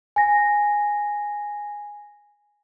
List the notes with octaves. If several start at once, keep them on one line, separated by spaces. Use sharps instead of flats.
G#5 A#6